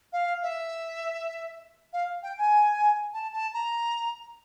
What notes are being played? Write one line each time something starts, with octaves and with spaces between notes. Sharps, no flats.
F5
E5
F5
G5
G#5
A5
A5
A#5